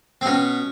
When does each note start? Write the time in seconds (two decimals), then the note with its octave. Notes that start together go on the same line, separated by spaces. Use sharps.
0.21 C4
0.26 B2 C#4